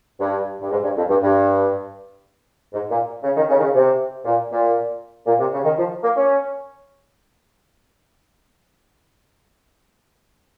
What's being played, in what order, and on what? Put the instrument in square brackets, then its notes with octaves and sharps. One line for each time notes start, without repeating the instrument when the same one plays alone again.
[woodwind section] G2
G2
G#2
G2
F2
G2
G2
G#2
A#2
C#3
D#3
C#3
D#3
C#3
C3
A#2
A#2
A#2
C3
C#3
D#3
F3
A#3
C#4